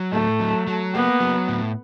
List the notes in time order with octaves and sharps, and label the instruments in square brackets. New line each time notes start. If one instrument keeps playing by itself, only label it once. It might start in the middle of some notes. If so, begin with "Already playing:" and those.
Already playing: [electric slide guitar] F#3
[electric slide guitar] A2 [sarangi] A3
[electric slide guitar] F#3
F#3
[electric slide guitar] A#3 [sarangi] B3
[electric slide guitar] F#3
A2